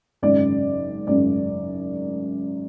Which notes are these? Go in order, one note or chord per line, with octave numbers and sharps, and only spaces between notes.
G#1 F#2 C#3 D5
G#1 F#2 C#3 D5